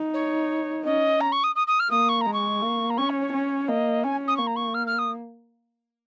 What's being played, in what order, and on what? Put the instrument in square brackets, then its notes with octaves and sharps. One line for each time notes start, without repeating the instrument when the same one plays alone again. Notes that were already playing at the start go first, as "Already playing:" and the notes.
Already playing: [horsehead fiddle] D#4
[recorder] C#5
[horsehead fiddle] C#4 [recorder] D#5
[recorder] A#5
C#6
D#6
D#6
D#6
F6
[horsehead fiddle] A#3 [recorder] D#6
[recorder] C#6
A#5
[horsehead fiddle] G#3
[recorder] C#6
[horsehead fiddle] A#3
[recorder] A#5
[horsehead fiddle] C#4 [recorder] C#6
[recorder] C#5
C#5
[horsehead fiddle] C#4
[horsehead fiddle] A#3 [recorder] D#5
[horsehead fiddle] C#4 [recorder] G#5
[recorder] D#6
[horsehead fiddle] A#3 [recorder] C#6
[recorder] A#5
C#6
F6
F6
D#6